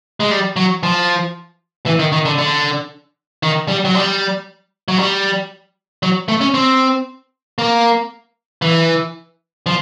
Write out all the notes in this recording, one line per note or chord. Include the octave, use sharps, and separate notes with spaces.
G#3
G3
F#3
F3
E3
D#3
D#3
D3
D3
D#3
G3
F#3
G3
F#3
G3
F#3
A3
C#4
C4
A#3
E3
F3